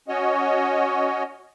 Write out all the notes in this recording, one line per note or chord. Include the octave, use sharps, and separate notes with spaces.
C#4 F#4 C#5 D#5